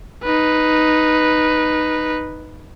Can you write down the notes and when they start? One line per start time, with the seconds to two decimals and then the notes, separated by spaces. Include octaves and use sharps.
0.23 D#4 B4